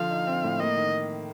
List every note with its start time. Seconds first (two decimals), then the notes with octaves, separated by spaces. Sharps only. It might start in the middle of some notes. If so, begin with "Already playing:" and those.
Already playing: D3 F3 F5
0.10 D#4
0.27 C4
0.44 A2
0.60 A#3 D#5
0.76 D#3